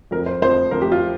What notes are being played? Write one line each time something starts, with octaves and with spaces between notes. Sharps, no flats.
F2 F3 A#4
C5
F2 F3 C5
F2 F3 A#4
G4
F4